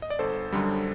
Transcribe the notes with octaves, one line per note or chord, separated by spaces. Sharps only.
D#5
D5
G1 A4 C5
F#2 D3 G3